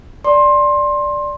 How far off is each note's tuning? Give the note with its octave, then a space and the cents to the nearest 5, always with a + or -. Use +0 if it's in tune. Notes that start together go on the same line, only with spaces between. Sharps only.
D5 +0 A5 +35 C6 +20